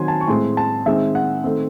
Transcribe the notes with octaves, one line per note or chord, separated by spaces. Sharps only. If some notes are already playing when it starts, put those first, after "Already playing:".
Already playing: D#3 F#3 C4 G#5 C6
A5
C#6
A2 G#3 C4 C6
A5
D#3 G#3 C4 E5
F#5
D#3 A3 C4